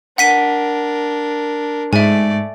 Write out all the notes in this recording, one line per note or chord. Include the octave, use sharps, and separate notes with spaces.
D4 A#4 F#5 B6 D#7
G#2 A3 D5 E5 G#5